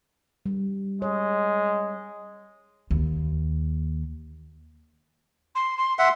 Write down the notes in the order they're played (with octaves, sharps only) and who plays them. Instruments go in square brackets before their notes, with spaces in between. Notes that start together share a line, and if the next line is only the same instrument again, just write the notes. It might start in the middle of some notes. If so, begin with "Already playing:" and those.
[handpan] G3
[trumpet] G#3 [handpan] C#5
[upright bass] D#2
[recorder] C6
C6
[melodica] E5 F#5 [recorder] C6